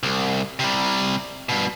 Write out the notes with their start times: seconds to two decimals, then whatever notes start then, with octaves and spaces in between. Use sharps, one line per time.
0.03 C2
0.59 C3 G3
1.49 G2 B2